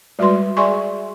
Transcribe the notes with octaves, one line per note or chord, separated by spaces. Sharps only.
G3 G#3 F#4 B4 C6
G#4 D5 E5 G#5 C6 C#6